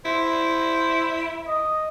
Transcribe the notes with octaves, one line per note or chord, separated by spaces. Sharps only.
E4 C5
D#5